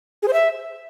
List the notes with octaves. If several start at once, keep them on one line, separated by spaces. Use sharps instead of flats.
G#4
C5
E5